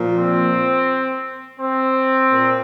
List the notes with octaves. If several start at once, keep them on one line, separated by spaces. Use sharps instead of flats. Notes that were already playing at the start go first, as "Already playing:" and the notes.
Already playing: A#2 F3
C4
C4
A#2